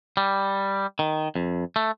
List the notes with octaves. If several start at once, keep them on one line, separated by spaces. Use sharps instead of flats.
G3
D#3
F2
A3